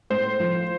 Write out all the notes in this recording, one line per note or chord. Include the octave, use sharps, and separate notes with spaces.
A2 C5
F3